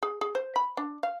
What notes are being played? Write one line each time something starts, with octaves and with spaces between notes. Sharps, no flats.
G#4
G#4
C5
B5
D4
F5